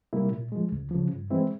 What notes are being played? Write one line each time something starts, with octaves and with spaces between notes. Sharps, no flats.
C3 G3 A#3 E4
A#2
F3 G#3
C#2
C#3 F3
G2
E3 G#3 C4 E4